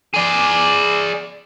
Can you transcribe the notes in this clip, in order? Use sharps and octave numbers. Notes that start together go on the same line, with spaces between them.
G#4 D5